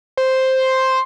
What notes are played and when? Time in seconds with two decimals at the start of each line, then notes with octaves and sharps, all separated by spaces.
0.17 C5